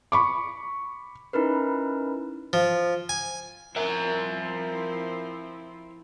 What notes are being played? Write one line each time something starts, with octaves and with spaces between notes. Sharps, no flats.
B5 C#6 D6
C#4 D#4 E4 A#4 B4
F3
G#5
F3 C4 E4 A#4 E5